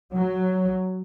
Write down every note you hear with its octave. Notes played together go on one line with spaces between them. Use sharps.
F#3